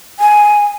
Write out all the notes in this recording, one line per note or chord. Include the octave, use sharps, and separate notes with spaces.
G#5